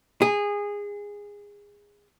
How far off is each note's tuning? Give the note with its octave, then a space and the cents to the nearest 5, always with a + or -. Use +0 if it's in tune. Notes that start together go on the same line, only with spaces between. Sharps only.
G#4 -20